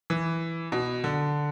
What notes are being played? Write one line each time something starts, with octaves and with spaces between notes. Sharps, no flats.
E3
B2
D3